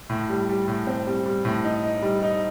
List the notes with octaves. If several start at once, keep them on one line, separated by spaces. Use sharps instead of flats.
A2
G3
G3
A2
C4
G3
G3
A2
D#4
D#4
G3
D#4